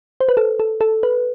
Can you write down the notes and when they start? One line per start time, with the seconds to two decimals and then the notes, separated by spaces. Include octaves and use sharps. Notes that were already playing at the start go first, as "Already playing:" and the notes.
0.20 C5
0.29 B4
0.37 A4
0.60 A4
0.81 A4
1.03 B4